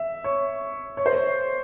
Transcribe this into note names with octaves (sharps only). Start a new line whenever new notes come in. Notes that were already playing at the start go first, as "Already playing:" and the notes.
Already playing: E5
C#5
C#5
C5
C#5